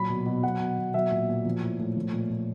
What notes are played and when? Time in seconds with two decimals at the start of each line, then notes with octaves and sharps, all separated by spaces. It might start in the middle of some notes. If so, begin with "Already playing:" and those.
Already playing: A#2 F#3 B5
0.09 B2
0.26 B2
0.43 F#3 F#5
0.60 B2
0.78 B2
0.94 F#3 E5
1.11 A#2
1.29 A#2
1.45 F3
1.62 A2
1.80 A2
1.97 F3
2.13 A#2
2.30 A#2